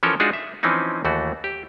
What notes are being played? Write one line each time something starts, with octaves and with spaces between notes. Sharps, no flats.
E3 F3 C#4 A4 A#4 C#5
G#3 D4 D#4 F4 F#4 G#4
E5
E3 F3 C4 C#4 D#4
D#2 E3 A3 F#4
G4